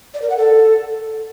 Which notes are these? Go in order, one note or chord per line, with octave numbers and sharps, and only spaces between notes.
D5
A#4
F#5
A4